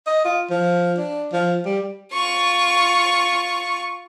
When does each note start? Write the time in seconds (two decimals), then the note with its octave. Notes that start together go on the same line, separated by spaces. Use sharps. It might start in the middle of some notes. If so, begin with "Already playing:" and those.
0.07 D#5
0.25 F4
0.50 F3
0.98 D4
1.32 F3
1.65 G3
2.14 F4 C#6